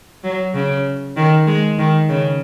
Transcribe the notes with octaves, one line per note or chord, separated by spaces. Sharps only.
F#3
C#3
D#3
G#3
D#3
C#3